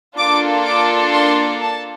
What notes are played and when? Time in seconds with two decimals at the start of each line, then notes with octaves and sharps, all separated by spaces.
0.17 A#3 D4 F4 A4 D6
0.65 D6
1.13 C6
1.61 A5